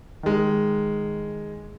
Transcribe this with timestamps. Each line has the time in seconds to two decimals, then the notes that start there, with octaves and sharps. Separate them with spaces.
0.23 D#3 G#3